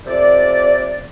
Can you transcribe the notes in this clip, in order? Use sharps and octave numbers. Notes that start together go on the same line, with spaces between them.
F2 C3 D5